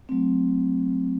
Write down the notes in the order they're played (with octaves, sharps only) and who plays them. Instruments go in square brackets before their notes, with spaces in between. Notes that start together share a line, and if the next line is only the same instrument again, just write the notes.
[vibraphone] F#3 A3 C4